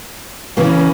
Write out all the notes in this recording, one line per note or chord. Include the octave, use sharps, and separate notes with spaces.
C#3 E3 A#3 C#4